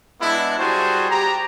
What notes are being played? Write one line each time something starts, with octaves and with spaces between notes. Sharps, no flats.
G#3 B3 D4 E4
G3 F#4 G#4 C5 A5
G4 A#5